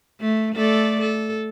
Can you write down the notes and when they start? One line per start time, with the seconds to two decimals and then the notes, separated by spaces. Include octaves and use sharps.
0.21 A3
0.55 A3 A4 D5
1.01 A4